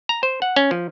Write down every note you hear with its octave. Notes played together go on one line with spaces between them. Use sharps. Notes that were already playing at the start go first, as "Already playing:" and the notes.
A#5
C5
F#5
C#4
F3